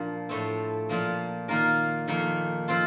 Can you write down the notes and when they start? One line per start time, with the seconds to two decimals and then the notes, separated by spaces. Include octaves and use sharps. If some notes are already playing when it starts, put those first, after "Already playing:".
Already playing: A#2 F3 A#3 D4
0.29 A2 A3 C4
0.89 A#2 F3 A#3
1.48 D#3 A#3 F4 A#4
2.08 F2 D#3 A#3
2.68 F3 C4 F4 C5